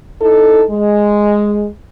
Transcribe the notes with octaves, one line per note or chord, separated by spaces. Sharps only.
D#4 E4 A4
G#3